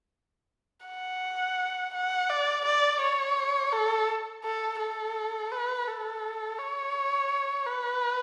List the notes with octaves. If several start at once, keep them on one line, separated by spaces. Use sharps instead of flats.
F#5
F#5
D5
D5
C#5
A4
A4
A4
B4
A4
C#5
B4